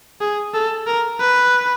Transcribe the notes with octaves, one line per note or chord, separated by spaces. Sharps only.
G#4
A4
A#4
B4